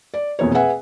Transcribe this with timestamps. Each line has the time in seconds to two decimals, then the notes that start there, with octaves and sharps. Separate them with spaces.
0.14 D5
0.39 F1 E2 B2 A#3 C#5
0.54 G#4 B4 E5 F#5 G#5